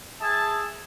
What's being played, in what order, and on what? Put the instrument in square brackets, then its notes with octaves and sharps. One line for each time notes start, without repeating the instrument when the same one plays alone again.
[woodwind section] G#4 E5 G#5 A5